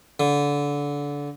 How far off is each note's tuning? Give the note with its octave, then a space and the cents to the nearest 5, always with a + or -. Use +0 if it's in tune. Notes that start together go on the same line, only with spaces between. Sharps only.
D3 -25